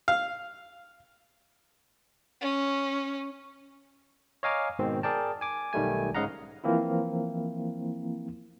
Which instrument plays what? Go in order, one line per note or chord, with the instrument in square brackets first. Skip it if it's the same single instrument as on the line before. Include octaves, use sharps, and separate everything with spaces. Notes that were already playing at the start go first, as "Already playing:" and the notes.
[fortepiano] F5
[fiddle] C#4
[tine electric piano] C#5 D#5 F5 G#5 A#5 D6
G#2 B2 D#3 C4
G#4 A#4 D5 G5 A5
G#5 D6
B1 D#3 G3 A3 G#5
G#2 C#3 D#5 F5 F#5 A#5
E3 F3 A#3 C4 E4